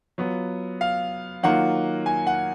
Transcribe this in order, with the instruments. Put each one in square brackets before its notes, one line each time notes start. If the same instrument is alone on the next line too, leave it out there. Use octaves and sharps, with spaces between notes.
[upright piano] F#3 B3 F4
[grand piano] F5
[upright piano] D#3 F#3 A#3 F4 [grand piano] F#5
[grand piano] G#5
F#5